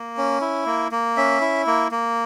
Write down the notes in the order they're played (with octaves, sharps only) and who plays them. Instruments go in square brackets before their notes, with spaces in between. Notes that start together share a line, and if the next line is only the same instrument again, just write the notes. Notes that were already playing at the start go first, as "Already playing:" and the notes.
Already playing: [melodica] A#3
C#4
E4
A#3
A#3
C#4 E5
E4
A#3
A#3